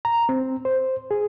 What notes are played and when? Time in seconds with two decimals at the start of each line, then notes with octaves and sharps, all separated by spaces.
0.05 A#5
0.29 C4
0.65 C5
1.11 G#4